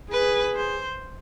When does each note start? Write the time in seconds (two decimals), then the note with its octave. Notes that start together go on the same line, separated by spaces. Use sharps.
0.12 G#4 B4
0.55 C5